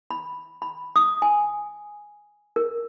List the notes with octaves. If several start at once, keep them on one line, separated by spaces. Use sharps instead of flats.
B5
B5
D#6
G#5
A#4